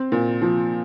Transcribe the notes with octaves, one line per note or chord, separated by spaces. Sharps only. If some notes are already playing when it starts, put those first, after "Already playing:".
Already playing: C4
A#2
F3